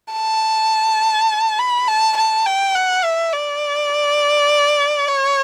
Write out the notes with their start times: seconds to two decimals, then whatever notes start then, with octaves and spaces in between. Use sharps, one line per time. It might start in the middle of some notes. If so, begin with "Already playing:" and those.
0.13 A5
1.59 B5
1.88 A5
2.17 A5
2.46 G5
2.75 F#5
3.04 E5
3.33 D5
5.08 C#5